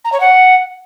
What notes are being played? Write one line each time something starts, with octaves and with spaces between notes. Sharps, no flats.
A#5
C#5
F#5